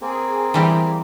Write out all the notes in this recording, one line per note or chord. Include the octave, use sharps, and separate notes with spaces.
A#3 C4 G#4
E3 G3 G4